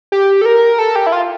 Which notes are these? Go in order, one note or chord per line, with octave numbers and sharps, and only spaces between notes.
G4
A4
A#4
A4
G4
E4
F4